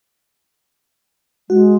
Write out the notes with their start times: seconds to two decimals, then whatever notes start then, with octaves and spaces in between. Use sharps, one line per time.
1.50 G#3 F#4